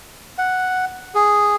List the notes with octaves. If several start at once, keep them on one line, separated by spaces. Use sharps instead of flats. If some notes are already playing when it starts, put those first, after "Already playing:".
F#5
G#4